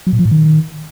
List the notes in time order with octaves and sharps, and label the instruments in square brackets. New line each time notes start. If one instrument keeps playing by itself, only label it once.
[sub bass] F#3
A#2
F3
A2
D#3